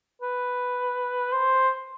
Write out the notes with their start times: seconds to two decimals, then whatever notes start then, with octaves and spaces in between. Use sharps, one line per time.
0.22 B4
1.32 C5